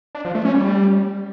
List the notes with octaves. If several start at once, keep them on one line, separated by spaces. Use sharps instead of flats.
D4
F3
A3
C#4
G3